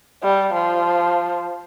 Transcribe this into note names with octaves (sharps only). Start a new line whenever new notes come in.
G3
F3